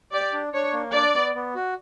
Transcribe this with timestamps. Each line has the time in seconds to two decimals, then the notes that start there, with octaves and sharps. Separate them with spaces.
0.12 G4 D5
0.33 D4
0.53 D4 C#5
0.73 A#3
0.93 D4 D5
1.15 B3
1.35 B3
1.55 F#4